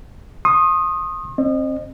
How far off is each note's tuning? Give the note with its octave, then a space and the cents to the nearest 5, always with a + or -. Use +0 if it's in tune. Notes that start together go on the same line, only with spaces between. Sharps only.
C6 +45 D#6 -5
C4 +25 D#5 -30